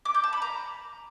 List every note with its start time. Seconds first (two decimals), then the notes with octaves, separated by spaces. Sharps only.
0.05 D6
0.14 G6
0.24 A5
0.33 B5
0.42 A#5